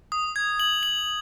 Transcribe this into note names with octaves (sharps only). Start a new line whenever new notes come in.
D#6
G#6
F#7
F#7